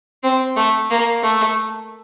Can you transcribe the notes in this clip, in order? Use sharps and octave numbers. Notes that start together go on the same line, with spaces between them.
C4
A3
A#3
A3